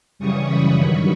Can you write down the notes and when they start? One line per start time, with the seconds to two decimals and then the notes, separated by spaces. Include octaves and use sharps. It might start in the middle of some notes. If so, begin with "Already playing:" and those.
0.19 F#2 C#3 E3 G3 C#6 D#6
0.47 B5 C#6
0.75 G2 D#3 F#3 B5 C#6